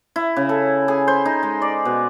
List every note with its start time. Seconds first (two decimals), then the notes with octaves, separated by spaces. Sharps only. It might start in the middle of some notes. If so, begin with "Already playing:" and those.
0.16 E4
0.36 C#3
0.49 A4
0.88 G#4
1.08 C5
1.25 D#4
1.43 G#3
1.62 D5
1.85 B2